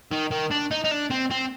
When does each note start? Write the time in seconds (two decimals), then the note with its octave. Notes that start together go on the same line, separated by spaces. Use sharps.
0.11 D#3
0.31 D#3
0.51 D4
0.71 D#4
0.84 D#4
0.91 D4
1.10 C4
1.31 C4